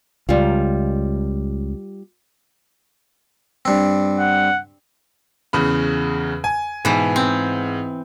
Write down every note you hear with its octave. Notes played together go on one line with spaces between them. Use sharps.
C#2 G3 F4
G2 C4
F#5
E2 C#3 B5
G#5
G#2 B2 E3
C4